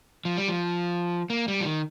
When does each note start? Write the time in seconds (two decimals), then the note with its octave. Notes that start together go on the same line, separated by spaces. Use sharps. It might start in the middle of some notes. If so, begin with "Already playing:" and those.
0.25 F3
0.37 G3
0.48 F3
1.30 A#3
1.48 G3
1.61 F3
1.65 D#3